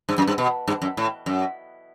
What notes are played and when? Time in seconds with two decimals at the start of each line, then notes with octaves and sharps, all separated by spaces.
0.09 G2
0.18 F#2
0.27 G2
0.38 B2
0.68 G2
0.82 F#2
0.97 A2
1.26 F#2